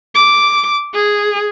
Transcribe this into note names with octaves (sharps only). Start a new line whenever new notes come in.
D6
G#4